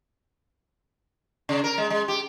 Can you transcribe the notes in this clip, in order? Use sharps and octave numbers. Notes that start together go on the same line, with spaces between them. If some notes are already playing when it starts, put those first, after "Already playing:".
C#3
A#4
G#3
G#3
G4